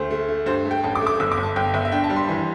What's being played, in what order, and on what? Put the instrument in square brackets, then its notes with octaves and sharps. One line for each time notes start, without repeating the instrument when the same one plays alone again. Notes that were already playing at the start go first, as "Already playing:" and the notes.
Already playing: [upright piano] D2 A3 C5
A3
A3
G2 C5
A3
G5
A1 A5
D6
A3
D6
G1 E6
D6
G1
A5
G1 G5
G1 E5
E5
D4 G5
A5
G3
C6
E3 C6